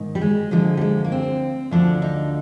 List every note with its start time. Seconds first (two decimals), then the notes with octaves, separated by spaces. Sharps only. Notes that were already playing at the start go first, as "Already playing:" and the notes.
Already playing: G#2 D#3
0.15 G3
0.21 G#3
0.51 D2 D3 F3 G#3
0.77 G3
0.81 G#3
1.04 A#3
1.12 C4
1.71 D2 D3 F3 D4
2.02 D#4